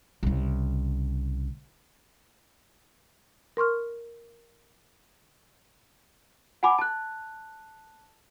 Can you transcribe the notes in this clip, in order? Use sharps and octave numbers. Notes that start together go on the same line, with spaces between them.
C2 C#3
A#4 C6 C#6 F6
F#5 G#5 B5 D6
A5 F#6